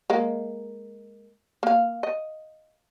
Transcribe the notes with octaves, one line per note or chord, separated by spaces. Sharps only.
G#3 A#3
A#3 F5
D#5